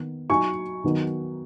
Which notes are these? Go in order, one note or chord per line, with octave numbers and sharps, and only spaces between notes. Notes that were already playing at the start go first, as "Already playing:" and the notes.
Already playing: D#3 B3
F#3 D#4 G#5 C#6
D#3 F#3 B3 D#4